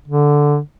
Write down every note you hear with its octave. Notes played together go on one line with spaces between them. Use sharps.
D3